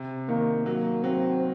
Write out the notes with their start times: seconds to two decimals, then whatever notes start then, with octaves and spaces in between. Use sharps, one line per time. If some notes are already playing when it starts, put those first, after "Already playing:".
Already playing: C3
0.29 D#3 A#3
0.66 F#3 A#3
1.04 F#3 C4